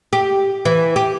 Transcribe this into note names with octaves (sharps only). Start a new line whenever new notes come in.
G4
E3
G4